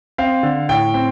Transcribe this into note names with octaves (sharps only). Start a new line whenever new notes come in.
C4 F5
D3
A2 G5
C4